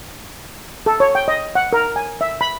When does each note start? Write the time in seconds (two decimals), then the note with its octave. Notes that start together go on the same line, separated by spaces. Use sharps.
0.86 A4
1.00 C#5
1.15 G5
1.28 D#5
1.55 F#5
1.73 A#4
1.96 G#5
2.21 E5
2.41 B5